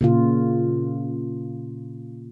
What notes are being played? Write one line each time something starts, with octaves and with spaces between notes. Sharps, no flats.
A#2 C#3 F4